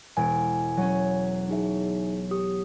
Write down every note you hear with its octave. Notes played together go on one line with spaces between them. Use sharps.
E1 G#5 D7
F#3 C#4
D#4 G#4 E5
G4 D#6